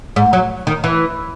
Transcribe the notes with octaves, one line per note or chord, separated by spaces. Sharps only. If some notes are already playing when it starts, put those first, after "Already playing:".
G#2
F#3
D#3
E3